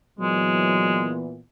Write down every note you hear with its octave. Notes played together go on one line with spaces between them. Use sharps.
A#2 E3 F#3 G#3 B3